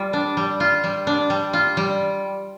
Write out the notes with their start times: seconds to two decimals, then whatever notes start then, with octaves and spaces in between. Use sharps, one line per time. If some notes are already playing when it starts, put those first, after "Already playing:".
Already playing: G3 F4
0.13 D4
0.37 G3
0.60 F4
0.84 G3
1.07 D4
1.30 G3
1.53 F4
1.77 G3